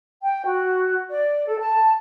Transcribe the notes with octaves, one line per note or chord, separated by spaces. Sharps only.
G5
F#4
D5
A4
A5